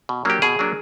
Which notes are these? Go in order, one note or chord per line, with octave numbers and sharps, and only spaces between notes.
B2
F#3 A#3 D4 G4
B2 G#4
F#3 A#3 D4